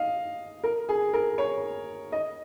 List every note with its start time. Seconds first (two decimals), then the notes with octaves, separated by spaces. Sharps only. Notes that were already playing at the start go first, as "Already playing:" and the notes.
Already playing: D#5 F5
0.64 A#4
0.89 G#4
1.13 A#4
1.38 C#5
2.12 D#5